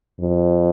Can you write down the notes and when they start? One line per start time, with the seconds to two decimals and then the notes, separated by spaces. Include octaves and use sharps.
0.20 F2